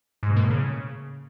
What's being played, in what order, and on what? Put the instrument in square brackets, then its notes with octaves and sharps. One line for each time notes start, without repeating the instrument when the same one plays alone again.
[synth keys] G#2
B2
A#3
A2
C#3